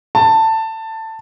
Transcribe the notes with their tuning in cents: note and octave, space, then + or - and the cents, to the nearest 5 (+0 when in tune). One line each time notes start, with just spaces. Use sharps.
A5 +15